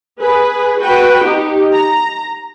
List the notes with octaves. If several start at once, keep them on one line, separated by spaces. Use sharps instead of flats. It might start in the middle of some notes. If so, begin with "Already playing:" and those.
G#4 B4
F#4 B4 G5
D#4 G4
A#5